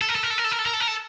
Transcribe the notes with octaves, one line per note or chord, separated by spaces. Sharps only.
A4
A#4
A4
A#4
A4
A#4
A4
A#4
A4
A#4
A4
A#4
A4